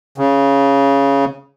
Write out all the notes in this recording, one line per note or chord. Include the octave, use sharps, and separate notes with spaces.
C#3